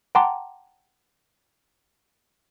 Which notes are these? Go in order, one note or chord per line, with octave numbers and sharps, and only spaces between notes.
F#5 G5 A5 A#5 C6 D6